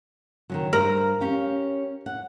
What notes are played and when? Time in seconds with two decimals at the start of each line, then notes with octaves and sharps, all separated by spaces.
0.50 D#3 F3 F#3
0.73 G2 A#4 C5
1.20 C#4 G4 F5
2.06 F#5